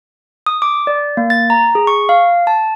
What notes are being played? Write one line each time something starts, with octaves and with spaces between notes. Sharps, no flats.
D#6
D6
D5
A#3
A6
A#5
G#4
C#6
F5
A5